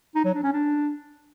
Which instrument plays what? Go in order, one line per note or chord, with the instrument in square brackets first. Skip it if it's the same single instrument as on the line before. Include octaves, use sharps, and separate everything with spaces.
[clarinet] D#4
F#3
D4
C#4
D4